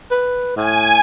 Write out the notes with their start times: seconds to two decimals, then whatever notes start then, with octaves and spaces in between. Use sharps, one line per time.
0.11 B4
0.56 A2 G#5